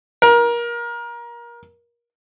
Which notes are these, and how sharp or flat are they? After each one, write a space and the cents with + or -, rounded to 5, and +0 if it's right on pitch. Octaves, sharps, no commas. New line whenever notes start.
A#4 +25